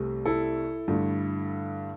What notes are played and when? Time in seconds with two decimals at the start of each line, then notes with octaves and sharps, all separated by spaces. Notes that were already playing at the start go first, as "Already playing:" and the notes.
Already playing: C2 C3 A3
0.25 E4 A4
0.88 G2 D3 A3